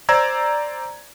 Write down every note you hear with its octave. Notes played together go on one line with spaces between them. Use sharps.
C5 D5 A#5 E6 G#6